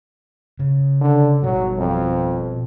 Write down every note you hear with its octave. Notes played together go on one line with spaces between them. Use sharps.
C#3
D3
B2 F#3 G3
F2